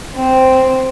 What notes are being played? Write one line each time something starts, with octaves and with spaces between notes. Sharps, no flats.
C4